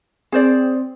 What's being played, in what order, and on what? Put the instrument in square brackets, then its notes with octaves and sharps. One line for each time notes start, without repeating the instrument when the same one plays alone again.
[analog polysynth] C4 [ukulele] G#4 C5 D5